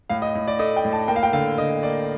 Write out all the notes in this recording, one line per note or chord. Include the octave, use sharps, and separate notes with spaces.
A2 F5
D#5
A2
D5
A3 D#5
G5
A2
A5
A#3 G5
F5
G5
D3 F5
D3 D#5
A#3 D5